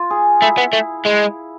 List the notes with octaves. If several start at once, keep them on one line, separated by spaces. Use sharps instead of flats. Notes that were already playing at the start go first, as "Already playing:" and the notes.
Already playing: F4
G#4
A3 E4
B3
A3
G#3